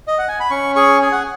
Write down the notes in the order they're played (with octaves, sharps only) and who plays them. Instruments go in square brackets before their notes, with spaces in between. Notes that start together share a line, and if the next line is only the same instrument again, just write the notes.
[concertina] D#5
F#5
G#5
B5
C#4 C#6
G#4 C#6
G#4 G#5
F#5